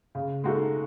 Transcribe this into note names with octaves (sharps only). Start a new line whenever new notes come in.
C#3
G#3 D#4 F#4 A4